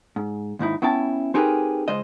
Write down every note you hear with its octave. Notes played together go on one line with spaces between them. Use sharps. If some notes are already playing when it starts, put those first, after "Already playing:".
G#2
D#2 G#2 D#4 E4
B3 C#4 E4 G5 A5
C4 D#4 G4 G#4 A#4 B4
C#2 G#3 C5 D#5